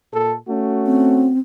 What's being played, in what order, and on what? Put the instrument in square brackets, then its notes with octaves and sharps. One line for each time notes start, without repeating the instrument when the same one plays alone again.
[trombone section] A#2 A4
A3 C#4 F#4
[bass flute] C4